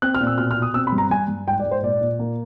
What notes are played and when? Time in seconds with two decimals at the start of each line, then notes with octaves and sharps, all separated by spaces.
0.02 C4 F#6
0.15 F6
0.20 A#2
0.27 E6
0.38 B2 F6
0.51 F6
0.57 B2
0.62 D#6
0.74 C4 E6
0.87 B5
0.92 G2
0.98 A#5
1.10 G2 G#5
1.28 G2
1.47 G#2 G5
1.60 D5
1.65 G#2
1.71 C5
1.83 A#2 D5
2.01 A#2
2.19 A#3